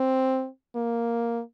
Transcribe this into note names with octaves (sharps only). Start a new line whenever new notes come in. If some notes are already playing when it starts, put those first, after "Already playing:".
Already playing: C4
A#3